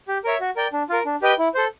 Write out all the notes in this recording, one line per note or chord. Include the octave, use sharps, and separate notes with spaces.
G4
A#4 C#5 E5
F#4
A#4 D5 G5
D4
F4 A#4
D4
G4 B4 D#5 G5
E4
A4 C5